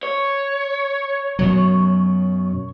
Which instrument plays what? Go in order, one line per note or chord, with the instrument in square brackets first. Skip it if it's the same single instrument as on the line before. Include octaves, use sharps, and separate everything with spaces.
[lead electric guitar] C#5
[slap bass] F#2 B2 F#3